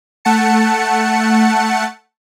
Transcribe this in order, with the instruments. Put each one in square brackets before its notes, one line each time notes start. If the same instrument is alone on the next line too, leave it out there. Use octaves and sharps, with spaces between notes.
[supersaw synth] A3 F#5 A5 C#7